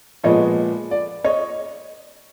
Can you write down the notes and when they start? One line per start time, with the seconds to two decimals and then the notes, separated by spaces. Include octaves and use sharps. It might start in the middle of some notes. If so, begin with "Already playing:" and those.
0.24 A#2 F3 G#3 B3 C#5 D#5
0.91 D5
1.24 C#5 D#5